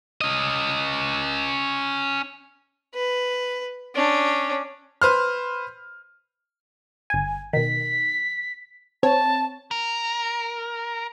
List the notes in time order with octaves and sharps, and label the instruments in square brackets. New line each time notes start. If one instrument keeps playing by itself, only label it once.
[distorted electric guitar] C#4 D#5
[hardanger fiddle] B4
C#4 D4
[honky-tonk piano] B4 C5 F6
[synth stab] G1 G#5
[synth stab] B2 D#3 [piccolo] B6
[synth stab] C4 C#5 [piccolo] A5
[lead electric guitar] A#4